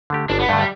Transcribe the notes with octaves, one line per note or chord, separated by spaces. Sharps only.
D3 A3 G4
G1 D4
B3
G2 D3 A3
G3